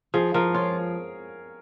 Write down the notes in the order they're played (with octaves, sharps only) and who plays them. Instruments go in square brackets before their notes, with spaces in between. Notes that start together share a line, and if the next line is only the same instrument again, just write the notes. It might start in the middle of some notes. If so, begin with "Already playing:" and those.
[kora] F3 [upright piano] G#4
[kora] F3 [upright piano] A#4
[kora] F4 [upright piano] C#5